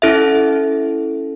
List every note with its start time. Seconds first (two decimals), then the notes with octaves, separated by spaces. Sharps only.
0.02 C#4 E4 A4 E5